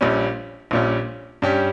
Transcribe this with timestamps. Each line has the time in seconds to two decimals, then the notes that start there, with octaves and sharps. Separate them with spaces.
0.01 A#1 A#2 G3 C#4
0.71 A#1 A#2 G3 C#4
1.42 G2 G3 C#4 G4